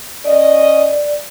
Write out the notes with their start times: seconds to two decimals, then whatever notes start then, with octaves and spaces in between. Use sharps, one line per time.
0.24 C#4 D5 D#5